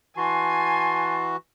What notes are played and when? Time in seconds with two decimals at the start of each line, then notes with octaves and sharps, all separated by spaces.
0.17 E3 F#4 G#5 A5 C6